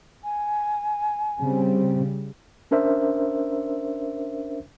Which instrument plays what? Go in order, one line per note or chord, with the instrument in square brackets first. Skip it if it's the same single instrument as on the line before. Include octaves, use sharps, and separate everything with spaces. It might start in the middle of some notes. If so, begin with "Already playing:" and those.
[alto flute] G#5
[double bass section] C#3 G3 [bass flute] C4
[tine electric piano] C#4 D4 A#4 C5 E5